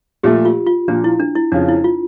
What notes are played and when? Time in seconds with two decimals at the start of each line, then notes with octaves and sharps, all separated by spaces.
0.23 A#2 F3 A3 G4
0.45 F4
0.66 F4
0.88 A#2 F3 A#3 D4
1.04 E4
1.20 D4
1.35 E4
1.52 F2 C#3 F3 D4
1.68 E4
1.84 F4